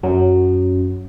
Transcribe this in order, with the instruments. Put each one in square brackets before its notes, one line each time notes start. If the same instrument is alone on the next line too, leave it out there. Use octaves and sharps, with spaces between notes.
[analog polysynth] F#2 [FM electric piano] F#3